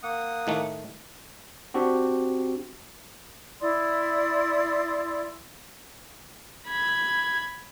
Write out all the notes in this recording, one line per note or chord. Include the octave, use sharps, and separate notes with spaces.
A#3 F#5 D#6
A2 D#3 A3
C4 D4 F#4 G4
E4 D5 C6 D#6
B5 G#6